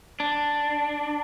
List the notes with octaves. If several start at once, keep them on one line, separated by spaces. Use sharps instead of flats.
D4